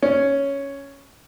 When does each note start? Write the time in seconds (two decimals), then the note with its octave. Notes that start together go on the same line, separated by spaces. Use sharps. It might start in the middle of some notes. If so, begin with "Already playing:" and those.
0.03 C#4